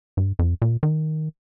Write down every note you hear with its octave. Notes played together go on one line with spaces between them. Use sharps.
G2
F2
A#2
D#3